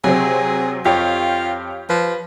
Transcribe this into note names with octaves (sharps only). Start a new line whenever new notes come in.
C3 F#3 C4 G#4
F2 F4 G4 C#5 F5 G5
F3 B4